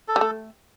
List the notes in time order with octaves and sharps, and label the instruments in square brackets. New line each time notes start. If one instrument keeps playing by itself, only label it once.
[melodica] A4
[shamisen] G3
A3